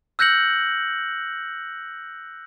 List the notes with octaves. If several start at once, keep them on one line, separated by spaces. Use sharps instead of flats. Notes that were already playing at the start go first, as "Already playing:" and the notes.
E6 F#6 G6 A#6 C#7 F#7